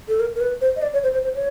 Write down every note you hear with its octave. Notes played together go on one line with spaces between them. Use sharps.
A4
A#4
A#4
B4
C5
D#5
D5
C#5
C5
C5
C5
C#5